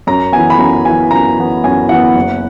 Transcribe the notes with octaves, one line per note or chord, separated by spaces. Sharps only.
F#2 A#5
E3 B3 G#5
B5
F#2 A#5
E3 B3 G#5
F#2 A#5
E3 B3
F#2 G#5
E3 B3 F#5
F#1